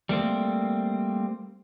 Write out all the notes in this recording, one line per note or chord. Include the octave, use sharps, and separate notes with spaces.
G3 A3 A#3 C4